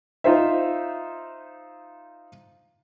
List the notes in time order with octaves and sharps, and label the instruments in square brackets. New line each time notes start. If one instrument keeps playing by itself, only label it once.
[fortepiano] D#4 F4 C5 E5